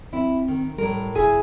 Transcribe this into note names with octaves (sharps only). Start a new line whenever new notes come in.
C4 E4
D#3
A2 G3 A#4
E1 E4 G#4 G#5